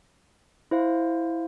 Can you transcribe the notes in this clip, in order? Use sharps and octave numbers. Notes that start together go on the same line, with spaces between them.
E4 C5 F5